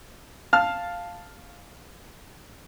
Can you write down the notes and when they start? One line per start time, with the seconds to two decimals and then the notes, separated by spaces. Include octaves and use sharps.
0.53 F5 A5 F6